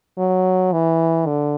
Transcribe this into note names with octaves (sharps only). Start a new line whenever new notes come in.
F#3
E3
D3